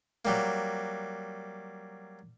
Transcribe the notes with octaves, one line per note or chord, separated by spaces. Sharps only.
F#3 G3 A#3